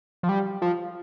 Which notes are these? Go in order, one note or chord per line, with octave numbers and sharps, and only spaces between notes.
F3
G3
F3